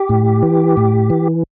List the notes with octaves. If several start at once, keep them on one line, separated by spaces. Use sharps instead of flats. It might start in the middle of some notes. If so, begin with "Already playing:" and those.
Already playing: G4
A2
E3
A2
E3